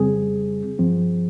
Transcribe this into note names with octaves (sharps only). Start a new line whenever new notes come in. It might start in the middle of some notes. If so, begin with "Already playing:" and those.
Already playing: F2 C#3 G3 C4 G#4
G2 F3 C4